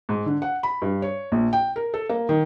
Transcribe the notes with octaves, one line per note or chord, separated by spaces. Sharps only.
G#2
D3
F#5
B5
G2
C#5
A#1
G5
A#4
A4
A#3
D#3